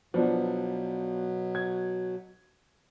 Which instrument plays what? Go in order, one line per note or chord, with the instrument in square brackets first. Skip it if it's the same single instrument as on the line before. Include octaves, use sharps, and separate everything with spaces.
[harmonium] B2 F#3 [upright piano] F3 B3 D4
[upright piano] G#6